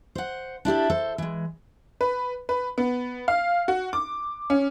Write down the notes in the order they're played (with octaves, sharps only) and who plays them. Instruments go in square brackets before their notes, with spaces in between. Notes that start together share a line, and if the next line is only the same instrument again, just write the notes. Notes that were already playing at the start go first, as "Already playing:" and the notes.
[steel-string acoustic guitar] C5 F#5
D4 E4 G4 A4
A4 C5
E3 G#3
[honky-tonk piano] B4
B4
B3
F5
F#4
D6
C#4